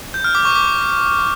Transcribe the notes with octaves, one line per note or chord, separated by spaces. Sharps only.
G6
F6
D6
C#6
D6